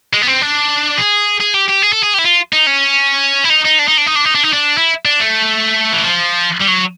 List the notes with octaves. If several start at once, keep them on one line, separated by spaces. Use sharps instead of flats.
G#3
B3
C4
D4
G#4
G#4
G4
G4
G#4
A4
G#4
G4
E4
F4
D#4
C#4
E4
D#4
D#4
D4
D#4
D4
D#4
D4
D#4
D4
D#4
D4
E4
D4
A3
E3
F3
G3
F#3